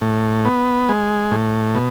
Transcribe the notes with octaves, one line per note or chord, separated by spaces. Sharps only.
A2
B3
G#3
A2
B2